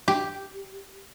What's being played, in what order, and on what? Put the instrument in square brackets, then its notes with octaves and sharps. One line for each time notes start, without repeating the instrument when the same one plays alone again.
[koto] G4